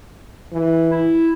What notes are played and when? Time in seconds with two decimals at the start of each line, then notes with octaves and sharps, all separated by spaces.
0.53 E3
0.91 E4